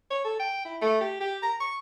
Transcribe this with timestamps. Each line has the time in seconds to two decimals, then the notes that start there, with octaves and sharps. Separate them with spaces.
0.10 C#5
0.24 A4
0.39 G5
0.65 E4
0.81 A3
1.01 G4
1.20 G4
1.43 A#5
1.60 C#6